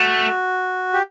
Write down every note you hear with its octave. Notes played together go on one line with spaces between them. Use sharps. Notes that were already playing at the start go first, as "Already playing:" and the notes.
Already playing: A3 F#4
G4